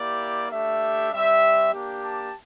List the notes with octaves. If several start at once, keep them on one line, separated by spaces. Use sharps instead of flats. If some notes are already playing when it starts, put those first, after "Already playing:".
Already playing: A#3 E4 G4 D5
A3 D4 G4 E5
G3 C4 G4 E5
A#3 D4 G4
A5